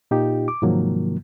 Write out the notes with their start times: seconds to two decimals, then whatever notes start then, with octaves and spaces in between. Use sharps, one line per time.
0.11 A#2 D#4 F4 G4
0.48 D6
0.62 G#2 C3 D#3 F3 F#3 A#3